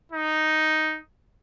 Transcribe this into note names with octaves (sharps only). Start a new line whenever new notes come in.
D#4